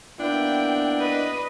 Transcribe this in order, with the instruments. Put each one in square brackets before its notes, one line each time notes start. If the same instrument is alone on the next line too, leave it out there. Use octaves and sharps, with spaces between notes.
[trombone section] A#3 B3 E4 [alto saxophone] D4 [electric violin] G5
[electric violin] B4 D#5